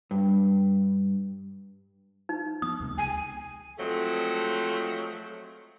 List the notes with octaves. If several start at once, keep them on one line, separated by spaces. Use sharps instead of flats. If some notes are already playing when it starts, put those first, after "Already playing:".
G2
D#4
F3 B3 D#6
D#2 C3 G#3
C#2 G#5
F3 F#3 G#3 A3 C4